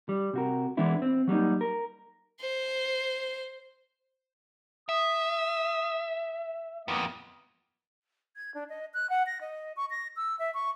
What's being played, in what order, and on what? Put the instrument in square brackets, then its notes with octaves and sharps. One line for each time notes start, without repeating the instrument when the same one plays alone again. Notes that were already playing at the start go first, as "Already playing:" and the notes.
[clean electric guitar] G3
C3 F#4 A#4
E3 G#3 B3 D4 E4
C4
F#3 G3 A#3 D#4
A#4
[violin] C5
[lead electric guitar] E5 [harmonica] D#6
[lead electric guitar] F2 B3 [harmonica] A#3 D#5
[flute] G#6
D4
D#5
F#6
F#5
A#6
D#5
C#6
A#6
E6
E5
C#6